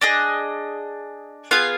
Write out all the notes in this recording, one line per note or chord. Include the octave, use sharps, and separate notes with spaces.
D4 G#4 D#5
B3 F4 G#4 F5